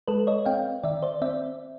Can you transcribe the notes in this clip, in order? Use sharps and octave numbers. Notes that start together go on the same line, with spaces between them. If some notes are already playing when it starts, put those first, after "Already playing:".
G#3 A4 B4
C#5 D#5
C4 F5 G5
D#3 D5 E5
C5 D5
C4 D5 E5